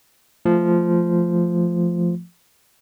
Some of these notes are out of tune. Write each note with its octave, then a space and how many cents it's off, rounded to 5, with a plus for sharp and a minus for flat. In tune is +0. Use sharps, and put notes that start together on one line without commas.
F3 -10 A3 +0